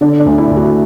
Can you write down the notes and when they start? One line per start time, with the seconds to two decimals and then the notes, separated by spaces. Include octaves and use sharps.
0.01 D3 D4
0.20 D4
0.26 D2
0.38 E4
0.51 D2
0.57 F#4